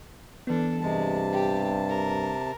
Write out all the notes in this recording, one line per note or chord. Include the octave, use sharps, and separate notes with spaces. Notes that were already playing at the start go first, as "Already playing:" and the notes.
E3 B3 D4 A4
G2 C3 G#3 A5
G4
A#4